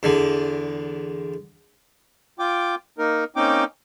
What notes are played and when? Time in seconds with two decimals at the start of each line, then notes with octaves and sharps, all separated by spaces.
0.03 E2 D3
2.39 F4 G5 D6
2.98 A#3 D#4 A#4
3.36 A#3 C4 C#4 D#4 G5 D6